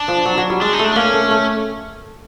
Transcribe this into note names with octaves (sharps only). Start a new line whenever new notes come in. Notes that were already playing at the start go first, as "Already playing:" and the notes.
Already playing: D4
F3
F#3
F#3
G3
G#3 D4
D#4
A3 D4
D4
A#3 C#4
A3
A3